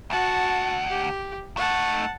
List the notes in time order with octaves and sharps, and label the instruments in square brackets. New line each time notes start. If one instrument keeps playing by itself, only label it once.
[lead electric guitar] D2 F#5 [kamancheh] F#4 A5
[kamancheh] G4
[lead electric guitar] A3 D#4 [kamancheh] F#5 A5